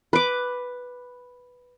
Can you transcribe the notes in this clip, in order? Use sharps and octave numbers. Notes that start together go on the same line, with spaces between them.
B4 D6